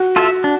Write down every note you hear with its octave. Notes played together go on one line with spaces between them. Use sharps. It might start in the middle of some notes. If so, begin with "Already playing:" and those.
Already playing: F#4
F4 A4 C#5 E5
D4